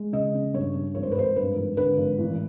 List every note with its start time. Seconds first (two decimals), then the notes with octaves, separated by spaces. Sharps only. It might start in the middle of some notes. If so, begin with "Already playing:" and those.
Already playing: G#3
0.13 C#3 D#5
0.34 C#3
0.54 G2 C#5
0.75 G2
0.95 G#1 C#5
1.03 C5
1.12 B4
1.16 G#1 C5
1.36 G2 B4
1.56 G#1
1.77 D3 B4
1.97 G#1
2.18 A1